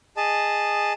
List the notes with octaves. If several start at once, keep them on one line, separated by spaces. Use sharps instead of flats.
G#4 D#5 A5